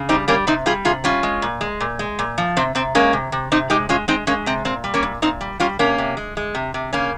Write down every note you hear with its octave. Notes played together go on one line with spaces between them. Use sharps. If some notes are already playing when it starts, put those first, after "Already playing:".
Already playing: C#3
G3 C4 D#4
G3 A#3 C#4
C3 C4 D#4
G3 F4 G#4
C3 F4 G#4
G3 C#4 F4
G#3
A#2
G#3
A#2
G#3
A#2
F3
C3 C4
C3 C4
G#3 A#3 C#4
C3
C3
C3 C4 D#4
G#3 D#4 G4
G#3 C#4 F4
G#3 C4 D#4
G#3 A#3 C#4
C3 C4
A#2 C4
G3
A#3 C#4
A#2
A#2 C4 D#4
G3
G3 C#4 F4
C3 A#3 C#4
C3
G#3
G#3
C3
C3
C#3 A#3 C#4